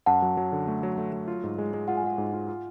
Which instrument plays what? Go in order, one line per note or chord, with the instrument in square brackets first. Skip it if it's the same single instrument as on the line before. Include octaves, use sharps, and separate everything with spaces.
[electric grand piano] F#2 [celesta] F#5 A5
[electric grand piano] F#3
F#3
D3
A3
F#3
A3
F#3
F4
G#2
G#3
G#3
[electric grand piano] F4 [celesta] F#5
[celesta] G#5
[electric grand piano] G#3 [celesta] F#5
[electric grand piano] G#2
F4
F4